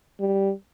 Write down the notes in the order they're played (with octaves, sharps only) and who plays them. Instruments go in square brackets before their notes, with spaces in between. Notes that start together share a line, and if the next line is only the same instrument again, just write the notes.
[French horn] G3